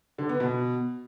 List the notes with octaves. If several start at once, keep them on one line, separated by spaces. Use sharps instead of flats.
D3
B3
B2